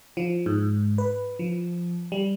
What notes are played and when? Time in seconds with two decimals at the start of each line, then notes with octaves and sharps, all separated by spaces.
0.17 F3
0.46 G#2
0.98 B4
1.39 F3
2.12 G3